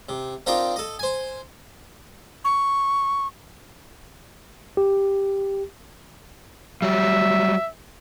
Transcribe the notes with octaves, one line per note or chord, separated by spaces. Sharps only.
C3
C4 D4 D#4 F4 A#4 G5
A4 D#5
C5 G#5
C#6
G4
F#3 G3 E5